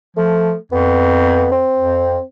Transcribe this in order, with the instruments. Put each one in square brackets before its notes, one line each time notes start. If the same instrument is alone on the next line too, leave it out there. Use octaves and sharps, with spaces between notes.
[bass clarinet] F3 [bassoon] A3
[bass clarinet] F2 [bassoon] B3
[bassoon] C4
[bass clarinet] F2